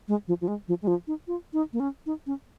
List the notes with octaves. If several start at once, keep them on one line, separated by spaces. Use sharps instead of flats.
G#3
F3
F3
G#3
F3
G#3
F3
D#4
F4
D#4
A#3
C#4
D#4
C#4